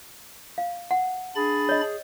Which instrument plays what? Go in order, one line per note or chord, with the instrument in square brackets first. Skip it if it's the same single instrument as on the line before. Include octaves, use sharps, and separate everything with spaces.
[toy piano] F5
F#5
[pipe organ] D4 B5 A6 [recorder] G#4
[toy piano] C#5 D#5